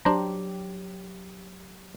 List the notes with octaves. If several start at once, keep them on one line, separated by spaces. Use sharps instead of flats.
F#3 D4 G4 C5 A#5